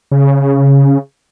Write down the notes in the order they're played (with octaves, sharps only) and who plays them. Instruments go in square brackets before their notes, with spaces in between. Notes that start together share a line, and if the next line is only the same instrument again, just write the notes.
[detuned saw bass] C#3